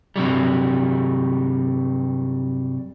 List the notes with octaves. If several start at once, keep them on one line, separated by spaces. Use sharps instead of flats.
G2 C3 F#3 G3